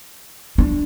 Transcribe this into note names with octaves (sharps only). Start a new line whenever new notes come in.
D4